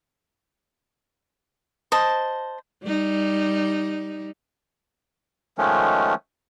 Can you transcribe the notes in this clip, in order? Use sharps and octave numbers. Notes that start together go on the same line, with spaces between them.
C5 D#5 A5
G3 D#4
D#3 F3 G#3 A3 C#4